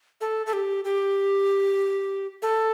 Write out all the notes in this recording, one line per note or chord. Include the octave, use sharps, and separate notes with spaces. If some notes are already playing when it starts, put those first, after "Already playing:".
A4
A4
G4
G4
A4